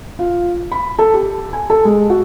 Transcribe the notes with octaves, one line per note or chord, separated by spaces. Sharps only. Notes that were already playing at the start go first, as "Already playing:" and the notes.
F4
B5
A4
G4
G#5
A4
G#3
F#4